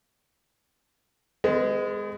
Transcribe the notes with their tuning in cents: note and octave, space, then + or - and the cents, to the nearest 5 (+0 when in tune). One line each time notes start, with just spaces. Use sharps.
G#3 +0 B3 +45